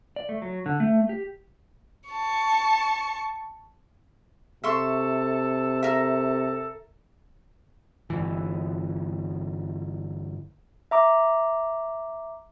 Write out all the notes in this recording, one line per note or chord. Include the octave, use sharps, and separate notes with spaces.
D5
A3
F#3
D3
A3
G4
A5 C#6
C3 A4 E5 C6 C#6
A4 A#4 E5
G1 E3
E5 A#5 D6